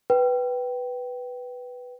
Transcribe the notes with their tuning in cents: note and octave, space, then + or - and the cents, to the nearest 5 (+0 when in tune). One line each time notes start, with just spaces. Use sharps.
B4 +0 G5 -15